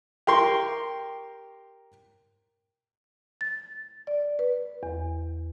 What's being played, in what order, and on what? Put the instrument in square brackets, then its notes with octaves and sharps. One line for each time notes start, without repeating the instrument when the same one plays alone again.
[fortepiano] G4 A#4 C6 C#6
[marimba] A6
D5
B4
E2